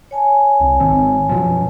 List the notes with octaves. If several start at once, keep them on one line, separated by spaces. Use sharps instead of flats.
C#5 G#5 A5
C2
G#1 D#3 C4
F#2 B2 F3